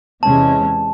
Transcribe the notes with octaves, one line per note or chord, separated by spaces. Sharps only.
E2 C3 E3 G#3 C#4 A5